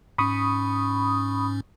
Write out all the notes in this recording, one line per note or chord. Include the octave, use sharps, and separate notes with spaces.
G#2 C#4 B5 C#6 D#6